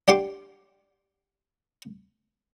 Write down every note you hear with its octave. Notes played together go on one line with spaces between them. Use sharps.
D4 G4 F#5 C6 D6